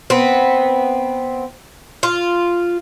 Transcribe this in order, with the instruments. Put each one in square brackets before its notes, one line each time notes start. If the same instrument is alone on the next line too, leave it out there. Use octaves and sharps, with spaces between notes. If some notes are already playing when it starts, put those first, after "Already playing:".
[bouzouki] B3 C4
F4